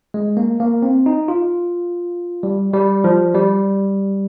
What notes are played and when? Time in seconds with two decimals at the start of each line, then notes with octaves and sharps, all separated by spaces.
0.14 G#3
0.37 A#3
0.60 A#3
0.82 C4
1.06 D#4
1.28 F4
2.43 G3
2.73 G3
3.04 F3
3.35 G3